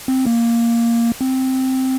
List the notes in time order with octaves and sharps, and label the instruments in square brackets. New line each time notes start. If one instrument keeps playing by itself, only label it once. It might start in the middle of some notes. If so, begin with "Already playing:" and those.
[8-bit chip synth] C4
A#3
C4